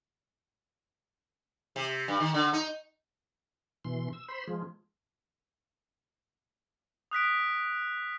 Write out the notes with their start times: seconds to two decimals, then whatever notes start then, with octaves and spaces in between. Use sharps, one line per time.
1.76 C3
2.08 G2
2.20 D#3
2.34 D3
2.53 D#4
3.85 B2 E3 C6
4.13 E6
4.28 C5 B5 C6
4.48 F3 G#3
7.11 D#6 F#6 B6 D7